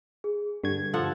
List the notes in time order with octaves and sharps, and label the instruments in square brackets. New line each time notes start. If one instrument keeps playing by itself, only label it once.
[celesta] G#4
[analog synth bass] G2 [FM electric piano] D3 G#6 [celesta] G4
[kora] F3 A4 F#5